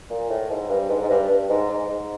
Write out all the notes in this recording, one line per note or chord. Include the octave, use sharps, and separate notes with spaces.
A#2
A2
G#2
G2
G#2
G#2
G2
G2
G#2
G#2
G#2